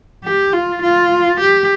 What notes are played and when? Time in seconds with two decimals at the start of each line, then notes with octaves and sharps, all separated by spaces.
0.24 G4
0.53 F4
0.82 F4
1.41 G4